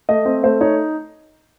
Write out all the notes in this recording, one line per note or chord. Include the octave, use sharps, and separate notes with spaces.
A3 D#5
C4
A3 C5
D#4 C#5